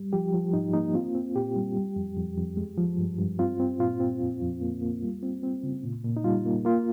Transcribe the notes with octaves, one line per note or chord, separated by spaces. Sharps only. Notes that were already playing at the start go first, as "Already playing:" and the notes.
Already playing: G3
F3 G4
F3
G#2 D#4
A#3 D#4
C4 F4
C4
A#2 G4
G3
G3
F2
F2
F2
G#3
F3
G2
G2
C4 F4
C4
A#2 F4
C4
F2
F2
A#3
A#3
G3
C4
C4
C#3
A#2
A#2
D#4
G3 F4
A#3
A#3 F4